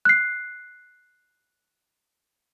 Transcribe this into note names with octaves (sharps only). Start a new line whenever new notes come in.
F#6 C7